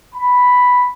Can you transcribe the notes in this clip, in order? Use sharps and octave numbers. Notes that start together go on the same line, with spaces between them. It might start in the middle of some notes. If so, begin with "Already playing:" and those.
B5